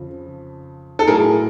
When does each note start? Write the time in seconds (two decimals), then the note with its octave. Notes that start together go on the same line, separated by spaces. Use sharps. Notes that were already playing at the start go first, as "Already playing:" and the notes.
Already playing: F2 C#3 F3
0.99 A4
1.07 A2 F#3 G#4 A#4